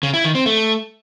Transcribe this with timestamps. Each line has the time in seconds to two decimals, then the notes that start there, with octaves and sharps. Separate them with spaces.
0.03 C#3
0.14 E4
0.24 D#3
0.35 C4
0.46 A3